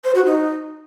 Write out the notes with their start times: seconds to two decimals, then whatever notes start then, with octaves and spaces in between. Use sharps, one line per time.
0.04 C5
0.15 F#4
0.25 D#4